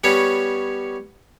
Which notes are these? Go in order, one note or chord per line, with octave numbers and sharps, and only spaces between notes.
G3 B3 C#4 C#5